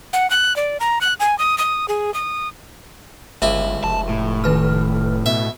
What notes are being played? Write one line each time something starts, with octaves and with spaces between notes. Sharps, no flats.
F#5
F#6
D5
A#5
F#6
G#5
D#6
D#6
G#4
D#6
G1 C#2 E4 E5
F1 A5
A2
D#3 B4 F6
B2 E5